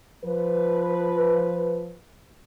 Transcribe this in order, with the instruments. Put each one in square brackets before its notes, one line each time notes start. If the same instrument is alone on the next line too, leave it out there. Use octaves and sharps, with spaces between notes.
[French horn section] F3 B4